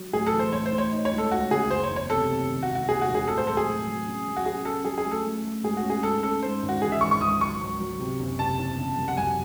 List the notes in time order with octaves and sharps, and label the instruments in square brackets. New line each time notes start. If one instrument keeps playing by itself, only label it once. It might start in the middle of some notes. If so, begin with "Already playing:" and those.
Already playing: [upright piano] F#3
[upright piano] A2 [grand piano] G#4
[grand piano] A4
[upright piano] E3
[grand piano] C5
[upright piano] A2 [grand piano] C#5
[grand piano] C5
[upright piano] A2
[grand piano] C#5
[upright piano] D#4
[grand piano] C#5
[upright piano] C#2
[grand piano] A4
[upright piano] C#2 [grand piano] F#4
[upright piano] C#3 [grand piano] G#4
[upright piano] F#1 [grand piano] C5
[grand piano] C#5
[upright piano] E2
[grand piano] C#5
[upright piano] C3 [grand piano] A4
[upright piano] C3
D#3
[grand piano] F#4
[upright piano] E1
[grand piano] F#4
[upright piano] D#2 [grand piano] G#4
[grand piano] F#4
[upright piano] E1
[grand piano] G#4
[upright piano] A1 [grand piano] A4
[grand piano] C5
[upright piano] F#3 [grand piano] A4
[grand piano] G#4
[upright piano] A1
F#3
C#4
F#3
[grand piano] F#4
[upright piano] C#4 [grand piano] G#4
[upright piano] C#4 [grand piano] A4
[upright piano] F#3 [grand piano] G#4
[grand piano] G#4
[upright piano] A3
[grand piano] A4
[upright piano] A3
A3
[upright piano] G#2 [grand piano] G#4
[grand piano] F#4
[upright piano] C#4
[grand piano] G#4
[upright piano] G#2 [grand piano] A4
[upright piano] C#4 [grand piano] A4
[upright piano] G#2 [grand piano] C5
[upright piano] G#1
[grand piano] F#4
[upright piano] E3 [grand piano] G#4
[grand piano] E5
[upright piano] G#1 [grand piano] C#6
[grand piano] C#6
[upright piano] C#2 [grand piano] D#6
[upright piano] F#3 [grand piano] C#6
[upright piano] C#2
F#3
C3
F#1
[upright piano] C3 [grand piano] A5
[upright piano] E2
C#3
F#2
[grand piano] F#5
[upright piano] F#2 [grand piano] G#5